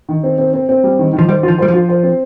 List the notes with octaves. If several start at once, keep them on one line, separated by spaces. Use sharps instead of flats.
D#3
C4
C4
C4
C4
G3
D#3
D#3
F3
G3 C5
F4
F3
G3 C5
F3
F4
C5
C4